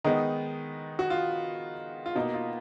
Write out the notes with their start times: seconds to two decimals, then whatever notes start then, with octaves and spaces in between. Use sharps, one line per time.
0.04 D#3 G#3 B3 D#4
0.99 F#4
1.10 F4
2.06 F4
2.15 B2 A#3 D#4
2.34 F4